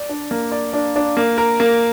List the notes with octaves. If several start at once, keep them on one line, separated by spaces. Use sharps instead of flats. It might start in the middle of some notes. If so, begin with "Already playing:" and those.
Already playing: D5
D4
A#3
D5
D4
D4
A#3
A#4
A#3